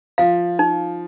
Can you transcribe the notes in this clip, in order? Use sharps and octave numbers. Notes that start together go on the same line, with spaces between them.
F3 F5
D#4